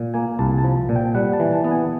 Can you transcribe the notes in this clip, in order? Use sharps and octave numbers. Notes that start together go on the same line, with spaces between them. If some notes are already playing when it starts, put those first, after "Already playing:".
Already playing: A#2
A#3 G#5
C2 A5
A5
F3
A#2
G5
G3 F#5
A5
E3
A5
B3
G#5